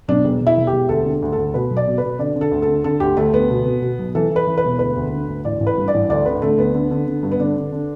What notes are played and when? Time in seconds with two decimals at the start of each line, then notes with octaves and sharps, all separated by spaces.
0.08 B1 D4
0.24 E1
0.41 E1
0.47 E4
0.58 E1
0.67 G4
0.73 E1
0.89 D2 A4
1.05 D3
1.22 D2
1.32 A4
1.38 D2
1.54 B2 B4
1.70 B1
1.77 D5
1.87 B2
1.98 B4
2.03 B2
2.19 D3 D5
2.36 D3
2.41 A4
2.51 D2
2.62 A4
2.68 D3
2.84 D3 A4
3.00 D2 G4
3.17 D2 A3
3.33 D2 B3
3.50 B2
3.66 B2
3.82 B2
3.99 B1
4.15 E3 A4
4.30 E3
4.36 B4
4.47 E3
4.58 B4
4.64 E1
4.79 D2 B4
4.96 D2
5.13 D3
5.28 D2
5.45 A1 D5
5.60 A1
5.67 B4
5.78 G2
5.88 D5
5.94 A1
6.10 D2 D5
6.26 D3 B4
6.42 D3 A3
6.58 D2 B3
6.75 D3
6.91 D3
7.07 D3
7.23 G2
7.32 B3
7.40 D3 D4
7.56 D3
7.72 D3